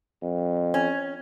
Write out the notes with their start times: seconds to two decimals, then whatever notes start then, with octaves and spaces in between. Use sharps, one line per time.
0.22 F2
0.74 C#4